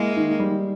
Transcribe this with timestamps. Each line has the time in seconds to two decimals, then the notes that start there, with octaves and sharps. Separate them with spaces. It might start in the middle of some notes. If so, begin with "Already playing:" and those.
Already playing: G#3 A#3 E4
0.17 D#3
0.40 G3